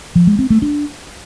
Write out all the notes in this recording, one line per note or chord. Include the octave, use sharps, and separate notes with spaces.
F3
G#3
C4
A3
D4